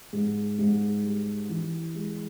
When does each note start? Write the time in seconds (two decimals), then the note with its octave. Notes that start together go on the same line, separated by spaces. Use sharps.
0.13 G#2
0.59 G#2
1.04 G3
1.49 E3
1.95 G#3